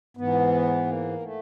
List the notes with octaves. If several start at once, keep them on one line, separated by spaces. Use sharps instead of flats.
G#2 E3 B3
A#3
A3